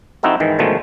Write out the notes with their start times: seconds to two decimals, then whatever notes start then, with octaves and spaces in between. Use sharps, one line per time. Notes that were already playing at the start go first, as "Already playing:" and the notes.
0.23 F3 C4 D#4 E4 F#4 A4
0.40 G#2 D#3 E3
0.59 B2 D3 D#3 F3 G#3 A3